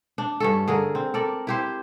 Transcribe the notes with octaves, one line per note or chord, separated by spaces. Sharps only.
D4
G2 C#4 A4
D3 G#4 A#4
C4
A4 A#4 D5
E4 G4 C5